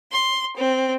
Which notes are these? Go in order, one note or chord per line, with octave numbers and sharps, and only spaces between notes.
C6
C4